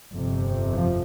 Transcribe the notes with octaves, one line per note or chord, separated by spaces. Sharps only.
G1 F2 C3
F3